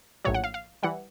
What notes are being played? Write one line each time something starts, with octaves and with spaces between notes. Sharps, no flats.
A#1 A2 F#3 C#5
F#5
F5
F5
E3 G3 F#5